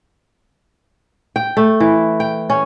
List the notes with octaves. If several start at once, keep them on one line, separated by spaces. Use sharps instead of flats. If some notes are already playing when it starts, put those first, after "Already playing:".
G5
A3
E3
G5
C#4